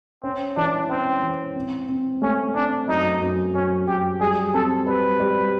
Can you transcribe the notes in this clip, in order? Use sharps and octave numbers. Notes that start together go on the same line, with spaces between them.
C4 C#4
E3 D4
C4 C#4
E3
C4
C4
A3 C#4
C4 D4
F#2 D#4
F#2
F#2 C#4
F#2 G4
G3 G#4
C4 A4
G3 B4
G3